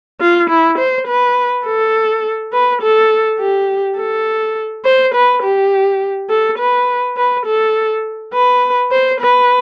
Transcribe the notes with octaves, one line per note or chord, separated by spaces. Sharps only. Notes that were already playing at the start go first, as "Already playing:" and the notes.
F4
E4
C5
B4
A4
B4
A4
G4
A4
C5
B4
G4
A4
B4
B4
A4
B4
C5
B4